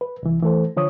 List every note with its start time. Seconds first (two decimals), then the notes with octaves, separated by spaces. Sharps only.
0.01 B4
0.23 C2 E3
0.42 E3 A3 A4 C5
0.77 D3 F3 C#5 C#6 D#6